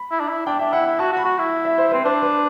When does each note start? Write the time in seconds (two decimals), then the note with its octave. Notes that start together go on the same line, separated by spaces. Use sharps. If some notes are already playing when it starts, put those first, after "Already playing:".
Already playing: B5
0.12 E4
0.20 D4
0.29 E4
0.46 D4 G5
0.59 D4 E5
0.73 E4 F#5
0.87 E4
0.99 F#4 A5
1.12 F#4
1.17 B5
1.25 F#4
1.39 E4
1.65 E5
1.78 C5
1.91 C4 B4
2.04 D4 C5
2.22 B4